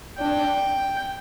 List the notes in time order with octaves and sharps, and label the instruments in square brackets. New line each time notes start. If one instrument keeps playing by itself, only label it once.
[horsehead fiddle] D4 [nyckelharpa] G5